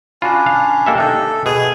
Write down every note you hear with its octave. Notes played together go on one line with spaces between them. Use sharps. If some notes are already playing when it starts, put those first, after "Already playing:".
C#4 D4 F4 F#4 B5
F5
A#3 G4 A4 D#5 E5 G5
D4 D#4 A4 E5
B2 G#4 D#5